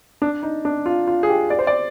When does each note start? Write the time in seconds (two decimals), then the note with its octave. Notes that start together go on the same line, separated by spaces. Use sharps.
0.22 D4
0.43 D#4
0.65 D4
0.86 F4
1.07 F4
1.23 G#4
1.29 G4
1.50 D5
1.59 C5
1.67 D5